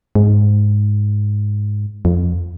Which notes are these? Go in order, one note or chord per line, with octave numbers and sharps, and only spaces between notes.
G#2
F2